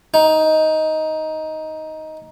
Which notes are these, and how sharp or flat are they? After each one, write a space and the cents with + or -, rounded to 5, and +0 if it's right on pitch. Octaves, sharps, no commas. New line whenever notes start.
D#4 +10